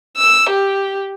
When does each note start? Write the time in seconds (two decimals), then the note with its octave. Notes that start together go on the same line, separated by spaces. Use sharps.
0.17 E6
0.49 G4